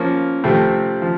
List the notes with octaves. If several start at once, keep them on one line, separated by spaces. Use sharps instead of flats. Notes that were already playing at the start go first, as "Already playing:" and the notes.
Already playing: F3 A#3 C#4
C3 F3 A3 C4
F3